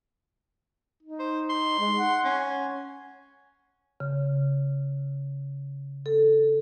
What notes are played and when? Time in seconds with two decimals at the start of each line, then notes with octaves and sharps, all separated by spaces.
1.03 D#4
1.19 C5
1.50 C6
1.79 G#3
1.98 F#5
2.25 C#4
4.00 C#3
6.06 A4